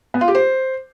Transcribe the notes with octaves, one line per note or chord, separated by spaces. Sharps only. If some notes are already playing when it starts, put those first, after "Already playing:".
B3
F4
G4
C5